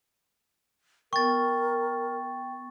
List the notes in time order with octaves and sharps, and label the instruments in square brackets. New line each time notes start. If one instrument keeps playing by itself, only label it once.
[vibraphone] B3 G5 [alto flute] A#4 [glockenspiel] C#6 A6